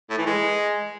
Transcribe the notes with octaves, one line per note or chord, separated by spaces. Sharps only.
A2
E3
G#3